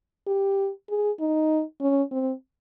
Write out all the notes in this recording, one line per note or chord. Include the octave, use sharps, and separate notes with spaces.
G4
G#4
D#4
C#4
C4